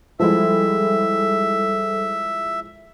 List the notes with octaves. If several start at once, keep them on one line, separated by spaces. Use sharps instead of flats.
F3 G3 G#3 E4 A4 E5